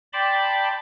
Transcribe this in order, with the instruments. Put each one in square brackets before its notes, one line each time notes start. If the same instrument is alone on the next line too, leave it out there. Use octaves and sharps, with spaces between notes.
[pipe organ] D5 G5 A5 B5 C6 D6